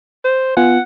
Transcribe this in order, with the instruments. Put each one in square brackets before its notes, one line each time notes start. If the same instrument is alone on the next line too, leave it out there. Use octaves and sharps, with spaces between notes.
[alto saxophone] C5
[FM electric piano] B3 F4 G#5 [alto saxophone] F#5